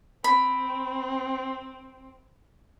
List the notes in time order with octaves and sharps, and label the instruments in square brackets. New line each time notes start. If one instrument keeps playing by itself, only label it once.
[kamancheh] C4 [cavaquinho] B5